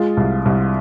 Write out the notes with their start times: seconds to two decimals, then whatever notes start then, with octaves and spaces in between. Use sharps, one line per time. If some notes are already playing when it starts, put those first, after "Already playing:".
Already playing: G#3 F4
0.17 C2
0.45 C2